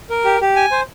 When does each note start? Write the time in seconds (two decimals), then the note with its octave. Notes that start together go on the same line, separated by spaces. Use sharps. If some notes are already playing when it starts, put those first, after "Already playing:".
0.10 A#4
0.25 G4
0.41 G4
0.56 G#5
0.71 C5